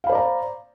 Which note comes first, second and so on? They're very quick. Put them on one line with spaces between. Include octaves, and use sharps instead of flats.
F5 B5 C5 D5 A#5